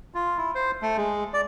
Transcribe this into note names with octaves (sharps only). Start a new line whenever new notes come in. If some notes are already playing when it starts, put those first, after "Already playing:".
F4
E4
C5
A3
G#3
D5